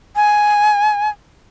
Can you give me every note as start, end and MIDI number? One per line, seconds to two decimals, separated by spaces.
0.16 1.09 80